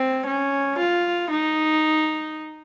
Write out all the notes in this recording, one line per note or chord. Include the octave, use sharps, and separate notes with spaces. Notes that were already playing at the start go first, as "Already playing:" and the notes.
Already playing: C4
C#4
F4
D#4